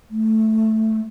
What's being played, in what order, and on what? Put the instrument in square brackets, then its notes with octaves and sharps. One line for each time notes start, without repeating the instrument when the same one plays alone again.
[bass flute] A3